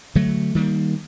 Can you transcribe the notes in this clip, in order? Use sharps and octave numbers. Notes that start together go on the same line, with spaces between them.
D3 F#3 A3
D#3 G3 A#3